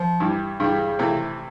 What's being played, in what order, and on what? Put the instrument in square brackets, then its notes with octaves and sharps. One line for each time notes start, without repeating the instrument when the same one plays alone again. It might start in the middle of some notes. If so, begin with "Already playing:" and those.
Already playing: [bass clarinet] F3
[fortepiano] G2 E3 G3
[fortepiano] G2 E3 G3 [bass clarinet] C#3
[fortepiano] C3 E3 A3 C4